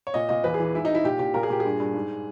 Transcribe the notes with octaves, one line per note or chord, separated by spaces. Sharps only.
C#5
A#2 D#5
A#2 D#5
E2 B4
G#4
E3
G#2 E4
D#4
G#2 E4
A#2 G4
A#2 G4
A#2 A#4
G#4
A#2 G4
G2 G#4
G2
G#2